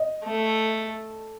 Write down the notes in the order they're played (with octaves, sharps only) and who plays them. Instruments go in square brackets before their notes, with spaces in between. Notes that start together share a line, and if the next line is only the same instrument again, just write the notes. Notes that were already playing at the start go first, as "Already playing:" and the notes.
Already playing: [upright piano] D#5
[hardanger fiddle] A3